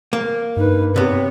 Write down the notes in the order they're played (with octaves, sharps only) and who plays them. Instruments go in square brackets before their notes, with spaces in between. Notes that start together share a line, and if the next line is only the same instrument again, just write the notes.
[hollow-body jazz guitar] A#3
[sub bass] G2 [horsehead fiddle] D#4 B4
[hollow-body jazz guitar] C3 B3 [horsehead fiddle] G4 C#5